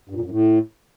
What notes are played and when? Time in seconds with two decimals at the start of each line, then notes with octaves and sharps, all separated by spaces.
0.10 G2
0.15 A#2
0.20 F2
0.26 F#2
0.31 A2